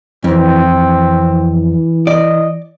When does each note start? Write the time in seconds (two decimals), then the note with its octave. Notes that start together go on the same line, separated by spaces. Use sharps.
0.24 F2 E3 C4
0.66 E3
2.07 D5 D#5